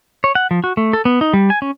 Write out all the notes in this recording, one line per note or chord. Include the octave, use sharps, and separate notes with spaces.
C#5
F#5
F3
F#4
A3
A4
B3
D#4
G3
G#5
C#4